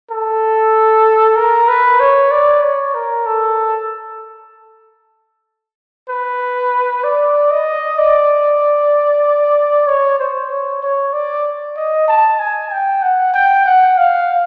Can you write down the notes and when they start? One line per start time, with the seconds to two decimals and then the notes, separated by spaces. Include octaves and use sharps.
0.11 A4
1.36 A#4
1.68 B4
2.00 C#5
2.31 D5
2.62 C#5
2.95 A#4
3.26 A4
6.09 B4
7.04 D5
7.51 D#5
7.98 D5
9.87 C#5
10.19 C5
10.50 C#5
10.82 C#5
11.13 D5
11.77 D#5
12.08 A5
12.39 G#5
12.72 G5
13.02 F#5
13.34 G5
13.65 F#5
13.98 F5